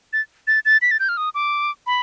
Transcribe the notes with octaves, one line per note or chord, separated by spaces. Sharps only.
A6
A6
A6
B6
A6
G6
F6
D#6
D6
B5